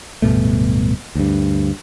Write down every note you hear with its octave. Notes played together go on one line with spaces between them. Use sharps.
D1 G2 B2 A3
D2 G2